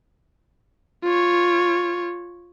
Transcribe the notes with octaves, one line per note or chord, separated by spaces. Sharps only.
F4 C#5